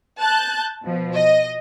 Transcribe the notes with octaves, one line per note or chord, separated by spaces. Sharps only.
A5 F#6 G6
B2 F3
D#5